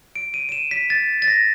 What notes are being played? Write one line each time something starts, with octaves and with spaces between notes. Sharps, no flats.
D7
D#7
D#7
E7
B6
A6
A6
A#6